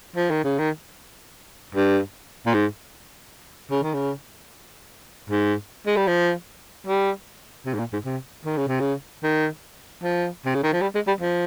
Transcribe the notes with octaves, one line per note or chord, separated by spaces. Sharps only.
F3
D#3
C#3
D#3
G2
A#2
G#2
C#3
D#3
C#3
G#2
G#3
G3
F3
G3
C3
G#2
A#2
G#2
C3
D#3
C#3
C3
C#3
D#3
F3
C3
C#3
D#3
F3
G3
G#3
G3
F3